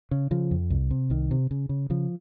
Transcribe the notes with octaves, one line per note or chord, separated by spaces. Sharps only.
C#3
C#3 F3
F2
C2
C3
C2 D#3
C3
C#3
C#3
C#3 F3